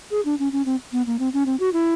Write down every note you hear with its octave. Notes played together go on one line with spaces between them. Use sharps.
G#4
D4
C#4
C#4
C4
B3
A#3
C4
C#4
C4
F#4
E4